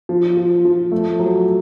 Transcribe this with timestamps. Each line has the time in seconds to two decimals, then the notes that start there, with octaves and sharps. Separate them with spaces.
0.09 F3
0.37 F3
0.65 F3
0.92 A3
1.19 F#3